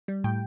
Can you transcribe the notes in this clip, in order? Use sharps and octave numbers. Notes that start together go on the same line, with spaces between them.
G3
A2 G5